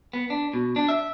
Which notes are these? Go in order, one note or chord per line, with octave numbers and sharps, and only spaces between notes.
B3
D4
B2
D4
E5